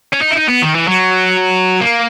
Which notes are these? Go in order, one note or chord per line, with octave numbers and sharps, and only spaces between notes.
C#4
D#4
E4
D#4
B3
D#3
E3
F#3
A#3